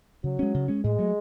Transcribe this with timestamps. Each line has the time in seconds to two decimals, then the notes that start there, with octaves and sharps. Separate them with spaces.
0.24 C#3 F#3
0.39 G#3 C#4
0.54 C#3
0.68 G#3 C#4
0.84 A2 G#3
0.99 F#3 A3